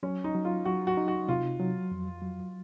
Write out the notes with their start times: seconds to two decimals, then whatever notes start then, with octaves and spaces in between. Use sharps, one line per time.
0.03 F#3 C#4
0.24 D#4
0.34 F#3
0.45 F4
0.65 F#3 F#4
0.87 F#4
0.97 D#4
1.08 F#4
1.29 C3 F4
1.60 F#3
1.91 F2
2.22 F#3